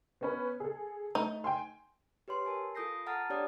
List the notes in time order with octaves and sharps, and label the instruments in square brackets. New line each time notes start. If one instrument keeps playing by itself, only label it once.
[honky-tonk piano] B3 C#4 B4
G#4 A4
[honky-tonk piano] A3 [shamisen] D#4
[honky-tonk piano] G5 G#5 C6
[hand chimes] G4 B4 C#5 C6
A#4 G#5 A5
F4 A4 D#6 G6 A#6 C7
A4 F#5 A5 A#5 F6 A6
D4 G4 C#5 D5 D#6